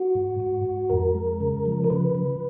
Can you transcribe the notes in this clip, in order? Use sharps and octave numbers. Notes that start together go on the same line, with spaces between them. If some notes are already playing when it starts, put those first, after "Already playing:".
Already playing: F#4
G#2
G#2
G#2
F2 A#4
G#3
C#3
F3
A#4
C#3 B4
C#3